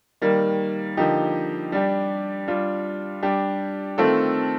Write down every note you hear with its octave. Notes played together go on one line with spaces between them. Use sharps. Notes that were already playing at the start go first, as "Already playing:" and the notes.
D#3 G3 A#3
D3 F3 A#3 D#4 G4
G3 D4 G4
G3 D4 F4
G3 D4 G4
D#3 A3 C4 F4 A4